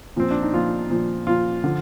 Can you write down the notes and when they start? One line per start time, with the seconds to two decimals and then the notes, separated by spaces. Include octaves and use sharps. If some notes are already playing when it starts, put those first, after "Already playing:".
0.16 A#2 F3 C4
0.31 D4
0.42 D#4
0.53 A#2 F3 F4
0.90 A#2 F3
1.27 A#2 F3 F4
1.64 D3 F3